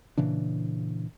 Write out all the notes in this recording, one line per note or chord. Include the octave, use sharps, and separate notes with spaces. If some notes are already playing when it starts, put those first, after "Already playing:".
A#2 C#3 E3 D4